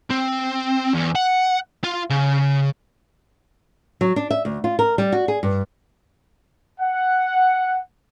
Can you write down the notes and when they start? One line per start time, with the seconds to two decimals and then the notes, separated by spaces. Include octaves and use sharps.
0.10 C4
0.94 E2
1.15 F#5
1.84 F4
2.10 C#3
4.01 F#3
4.16 D4
4.31 E5
4.45 D2
4.64 F4
4.79 A#4
4.98 G3
5.12 F#4
5.28 G#4
5.43 G2
6.80 F#5